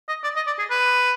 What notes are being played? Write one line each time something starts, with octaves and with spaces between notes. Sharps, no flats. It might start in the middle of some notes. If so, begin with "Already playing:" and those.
D#5
D5
D#5
D5
G#4
B4